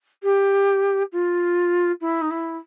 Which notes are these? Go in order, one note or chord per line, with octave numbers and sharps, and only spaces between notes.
G4
F4
E4
D#4
E4